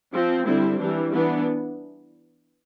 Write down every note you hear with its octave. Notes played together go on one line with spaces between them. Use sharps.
F3 C4
D3 G3 C4 E4
E3 G3 D4
E3 B3 D4